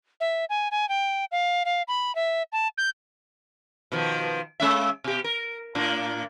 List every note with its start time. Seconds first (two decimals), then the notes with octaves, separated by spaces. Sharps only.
0.20 E5
0.49 G#5
0.71 G#5
0.89 G5
1.31 F5
1.65 F5
1.88 B5
2.15 E5
2.52 A5
2.78 G6
3.92 B2 D#3 F3
4.60 G#3 C#4 E5
5.04 B2 G4
5.24 A#4
5.75 A2 A#3 D4